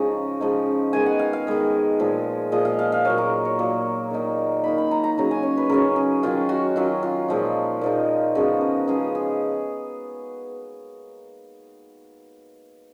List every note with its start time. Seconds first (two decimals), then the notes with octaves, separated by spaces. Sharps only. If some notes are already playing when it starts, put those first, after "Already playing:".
Already playing: C#3 F3 G#3 C#4 D#4 D#5 G#5 A#5
0.40 C#3 F3 G#3 D#4
0.93 D#3 G#3 B3 G#5
1.06 F#5
1.19 F5
1.33 F5
1.47 D#3 G#3 B3
1.99 A#2 F3 G#3
2.52 A#2 F3 G#3 D#5
2.65 F5
2.79 F5
2.92 F5
3.05 A#2 F#3 A#3 C#5
3.18 A#4
3.45 C#5
3.59 A#2 F#3 A#3
4.11 D#3 A#3 D#4
4.64 D#3 A#3 D#4 B5
4.78 B5
4.91 A#5
5.04 A#5
5.18 C#3 F#3 C#4 A#5
5.31 G#5
5.43 C#5
5.57 B4
5.69 C#3 F#3 C#4 A#4
5.96 G#4
6.23 D#3 F#3 C#4 F4
6.49 F#4
6.76 D#3 F#3 C#4 F4
7.03 F4
7.28 A#2 F3 G#3 D#4
7.81 A#2 F3 G#3 D#4
8.35 C#3 F3 G#3 B3 F#4
8.61 A#4
8.88 C#3 F3 G#3 B3 G#4
9.15 G#4